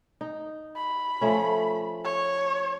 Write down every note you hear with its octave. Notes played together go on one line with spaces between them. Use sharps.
D#4
B5
F3 A3 C#4
C#5